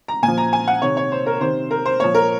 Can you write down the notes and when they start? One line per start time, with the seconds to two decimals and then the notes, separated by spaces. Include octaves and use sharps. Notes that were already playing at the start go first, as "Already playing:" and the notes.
0.08 A#5
0.22 A#2 G#5
0.28 F3
0.38 A#5
0.53 G#5
0.68 F#5
0.82 C3 D#3 C#5
0.97 C#5
1.12 C5
1.26 A#4
1.41 C3 D#3 C5
1.71 A#4
1.86 C5
2.00 A#2 F3 C#5
2.14 A#4